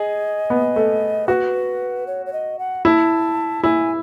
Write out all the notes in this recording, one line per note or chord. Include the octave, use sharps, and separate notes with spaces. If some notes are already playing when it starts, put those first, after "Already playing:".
Already playing: G#4 D#5
B3
A3
F#4 B4
C#5
C#5
D#5
F#5
E4 A5
E4 G#5